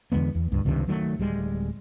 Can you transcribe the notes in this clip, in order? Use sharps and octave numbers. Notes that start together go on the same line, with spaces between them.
E2 D3 G#3 B3
E2
C#2 G2
C#2 G2 C3 D#3
D#3 F#3 G3 A3
D1 G3 G#3